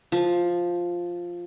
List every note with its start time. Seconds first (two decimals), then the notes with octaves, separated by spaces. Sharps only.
0.12 F3